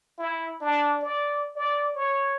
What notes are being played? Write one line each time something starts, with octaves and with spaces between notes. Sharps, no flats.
E4
D4
D5
D5
C#5